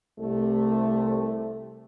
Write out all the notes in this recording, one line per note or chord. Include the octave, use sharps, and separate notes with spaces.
C2 C3 A3